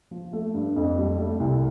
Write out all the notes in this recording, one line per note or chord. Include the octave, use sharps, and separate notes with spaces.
F3
A3
G2
F2
G3
A3
C2